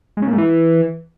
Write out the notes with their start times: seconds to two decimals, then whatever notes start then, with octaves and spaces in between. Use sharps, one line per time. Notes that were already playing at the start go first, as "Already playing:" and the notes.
0.17 G#2
0.22 C#3
0.28 A#2
0.33 G#2
0.38 E3